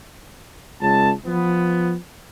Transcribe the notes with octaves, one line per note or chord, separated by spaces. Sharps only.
C#2 A5
F3 B3